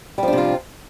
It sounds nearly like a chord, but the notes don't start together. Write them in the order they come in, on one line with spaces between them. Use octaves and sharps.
G3 F3 D4 C3 F4